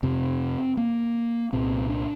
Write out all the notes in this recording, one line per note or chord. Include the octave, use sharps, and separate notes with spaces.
F2 C3 C4
A#3
C2 A#2 C4
D4